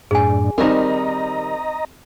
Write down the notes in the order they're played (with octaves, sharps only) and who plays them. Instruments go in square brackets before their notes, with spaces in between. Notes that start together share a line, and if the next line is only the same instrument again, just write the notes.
[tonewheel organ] F#2 A2 D4 [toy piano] G#4 G#5
[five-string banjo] D#3 G3 A#4 [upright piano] C4 D#4 [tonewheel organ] D#5 A#5